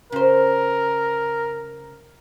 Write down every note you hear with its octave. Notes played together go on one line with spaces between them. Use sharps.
C#3 A#4 C5